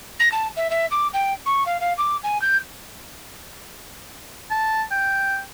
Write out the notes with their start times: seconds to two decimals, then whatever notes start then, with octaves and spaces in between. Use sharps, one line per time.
0.19 A#6
0.32 A5
0.56 E5
0.70 E5
0.91 D6
1.13 G5
1.46 C#6
1.66 F5
1.80 F5
1.98 D6
2.23 G#5
2.42 G6
4.51 A5
4.91 G5